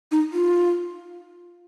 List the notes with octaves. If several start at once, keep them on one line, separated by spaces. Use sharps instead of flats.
D#4
F4